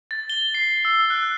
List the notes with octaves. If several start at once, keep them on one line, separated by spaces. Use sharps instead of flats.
A6
G7
C7
E6
F#6